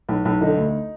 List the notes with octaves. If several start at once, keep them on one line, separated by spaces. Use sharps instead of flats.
B1
B1
D3 D#4
D2